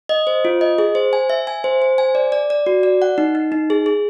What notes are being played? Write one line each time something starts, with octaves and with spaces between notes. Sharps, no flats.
D#5
C5
F4
D#5
G#4
C5
G#5
E5
G#5
C5
C5
G#5
D5
D5
D5
F#4
D5
F#5
D#4
D#4
D#4
G#4
G#4